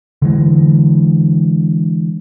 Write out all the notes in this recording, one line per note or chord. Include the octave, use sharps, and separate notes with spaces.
D3 E3 G#3